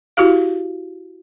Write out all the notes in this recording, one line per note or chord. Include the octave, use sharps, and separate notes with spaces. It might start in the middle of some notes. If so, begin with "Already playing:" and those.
E4 F#4 G4 F5